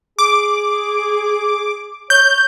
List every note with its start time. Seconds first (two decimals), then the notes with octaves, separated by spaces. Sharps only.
0.19 G#4 D6
2.10 C#5 G6